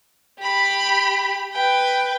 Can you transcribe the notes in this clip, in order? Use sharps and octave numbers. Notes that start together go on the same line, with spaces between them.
G4 B5
B4 G5